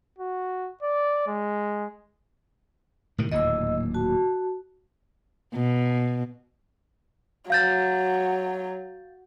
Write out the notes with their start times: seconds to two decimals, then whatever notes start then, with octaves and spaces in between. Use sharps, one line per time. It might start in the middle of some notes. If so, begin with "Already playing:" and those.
0.18 F#4
0.83 D5
1.27 G#3
3.18 A2 C3 D#3
3.32 D1 D#2 A#2 D#5 E6
3.94 F#4 A5
5.55 B2
7.50 F#3 F5 G6 A6